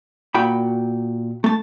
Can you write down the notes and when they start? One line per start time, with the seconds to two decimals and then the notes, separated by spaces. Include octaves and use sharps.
0.34 A#2 F#4 G5 B5
1.44 A3 A5